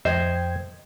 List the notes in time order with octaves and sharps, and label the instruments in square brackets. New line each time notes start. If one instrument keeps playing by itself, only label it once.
[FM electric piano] F2 G5 G#6 [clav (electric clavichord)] C5 [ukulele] D#5